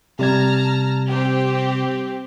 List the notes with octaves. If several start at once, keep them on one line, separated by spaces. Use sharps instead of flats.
C3 G3 A5 A#5 F6 G#6
C4 G4